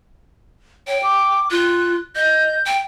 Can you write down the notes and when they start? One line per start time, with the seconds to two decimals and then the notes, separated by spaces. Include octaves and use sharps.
0.87 C#5 G5
1.03 D6
1.51 F4 F#6
2.16 D#5 G6
2.66 G5